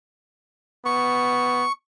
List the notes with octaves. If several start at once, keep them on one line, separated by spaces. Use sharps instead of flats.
B3 C#6